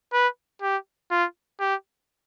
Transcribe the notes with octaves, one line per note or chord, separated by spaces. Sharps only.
B4
G4
F4
G4